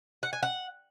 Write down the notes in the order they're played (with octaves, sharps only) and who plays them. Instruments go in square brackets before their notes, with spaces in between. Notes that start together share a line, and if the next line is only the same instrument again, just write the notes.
[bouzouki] F#5
G#5
F#5